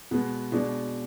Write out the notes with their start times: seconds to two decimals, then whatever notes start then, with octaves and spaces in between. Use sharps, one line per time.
0.11 B2 G#3 B3
0.52 B2 G#3 D4